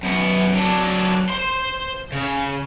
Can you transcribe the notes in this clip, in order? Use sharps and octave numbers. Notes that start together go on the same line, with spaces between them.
F#2 B3
F#3 D4
C5 C6
C#3